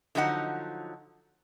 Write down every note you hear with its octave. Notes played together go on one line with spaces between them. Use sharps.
D3 F3 F#3 D#4 F4 F#5